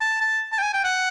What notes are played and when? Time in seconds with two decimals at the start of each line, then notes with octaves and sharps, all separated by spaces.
0.01 A5
0.21 A5
0.52 A5
0.58 G5
0.63 G#5
0.73 G5
0.84 F#5